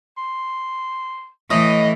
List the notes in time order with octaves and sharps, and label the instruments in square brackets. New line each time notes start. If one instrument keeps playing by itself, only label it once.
[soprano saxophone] C6
[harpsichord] A2 [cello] E3 [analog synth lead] D#5